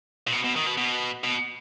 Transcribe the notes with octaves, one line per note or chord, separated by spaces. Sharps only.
A#2
B2
B2
D#3
B2
B2
B2